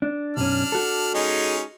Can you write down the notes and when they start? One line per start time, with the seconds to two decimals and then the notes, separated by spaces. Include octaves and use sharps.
0.02 D4
0.37 B1 F#2 C#4 D4 F6
0.72 F#4 A4
1.14 G#3 C#4 D#4